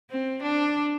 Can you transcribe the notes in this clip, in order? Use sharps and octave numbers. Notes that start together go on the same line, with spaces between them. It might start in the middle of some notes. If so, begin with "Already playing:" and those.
C4
D4